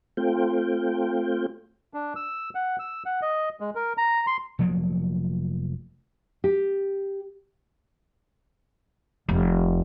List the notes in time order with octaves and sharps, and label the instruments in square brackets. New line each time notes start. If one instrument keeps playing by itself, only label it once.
[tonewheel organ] A3 C4 F4 G5
[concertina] D4
E6
F#5
E6
F#5
D#5
G#3
A#4
A#5
C6
[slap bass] F1 F3 F#3 A#3
[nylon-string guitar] G4
[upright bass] F1